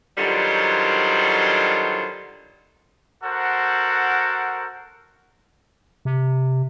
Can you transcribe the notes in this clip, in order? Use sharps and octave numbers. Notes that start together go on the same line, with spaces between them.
D3 D#3 F#3 G3 F4 C5
F#4 A4 A#4 C5 F#5
C3